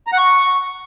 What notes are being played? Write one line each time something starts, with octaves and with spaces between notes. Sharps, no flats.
A#5
F#5
C#6